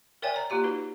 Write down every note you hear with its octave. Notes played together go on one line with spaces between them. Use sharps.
A#4 C#5 D5 E5 G5 G#5
C#5 A#5
A#3 F4 G4 A#5
D#4 F#4 B4